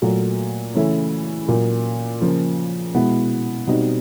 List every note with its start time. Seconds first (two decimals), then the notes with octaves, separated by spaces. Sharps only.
0.02 A#2 F#3 A3
0.75 C#3 E3 A3 C#4 E4
1.48 A#2 F#3 A#3
2.21 C#3 F3 A#3
2.94 B2 G#3 B3 E4
3.67 B2 G3 C4 D#4